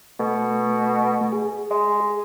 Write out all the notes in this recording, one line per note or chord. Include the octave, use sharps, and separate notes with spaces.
B2 A3
G#4
G#3